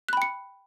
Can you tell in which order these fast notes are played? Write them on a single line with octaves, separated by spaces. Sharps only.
F#6 B5 G5 C#7